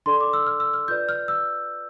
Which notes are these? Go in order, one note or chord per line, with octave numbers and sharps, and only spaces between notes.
D4 A4 D5 C6
D6
E6
F6
E6
F6
F4 B4 D5 G6
F6
E6